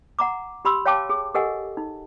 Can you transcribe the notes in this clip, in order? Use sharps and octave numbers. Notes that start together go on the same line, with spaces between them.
F#5 A#5 D6
G4 B5 C6 E6
C#5 F5 G5 A5 D6
G#4
G4 A4 A#4 D#5 F#5 G#5
D#4